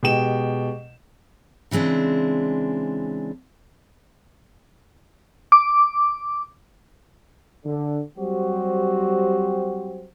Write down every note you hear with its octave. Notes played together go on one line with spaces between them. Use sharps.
B2 G#3 G4 G5 E7
C#3 E3 G#3 C4 D4
D6
D3
F#3 G3 C4 F#4 G4 C5